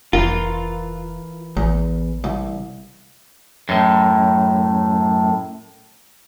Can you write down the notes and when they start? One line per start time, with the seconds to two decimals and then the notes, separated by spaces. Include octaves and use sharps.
0.13 F1 E3 F4 A#4
1.57 A1 E2
2.24 C2
3.69 F#2 A2